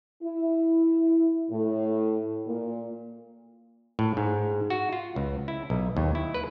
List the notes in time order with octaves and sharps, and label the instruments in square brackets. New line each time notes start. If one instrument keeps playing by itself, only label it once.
[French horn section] E4
A2
A#2
[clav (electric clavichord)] A2
G#2
F#4
F4
C#2
E4
B1
D#2
E4
B4